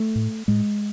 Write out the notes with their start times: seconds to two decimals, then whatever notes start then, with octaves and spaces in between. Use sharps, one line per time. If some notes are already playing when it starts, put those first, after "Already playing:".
Already playing: A3
0.15 A2
0.48 A2 G#3